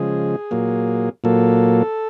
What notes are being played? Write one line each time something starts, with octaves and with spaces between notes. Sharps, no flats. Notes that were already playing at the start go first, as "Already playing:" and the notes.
Already playing: C#3 F3 G#3 G#4
A#2 F#3 A#3
A#2 F#3 A#3 A4